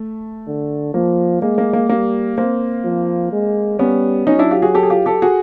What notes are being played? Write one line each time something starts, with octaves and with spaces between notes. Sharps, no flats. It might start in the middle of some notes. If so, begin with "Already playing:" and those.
Already playing: A3
D3
F3 A#3
G#3 A#3
A#3
A#3
G3 A#3
A#3 C4
F3
G#3
G3 B3 C#4
F#3 C#4 D#4
D4 E4
F4 G4
F#4 G#4
G4 A4
G#4
F4 G4
G4 A4
F#4 G#4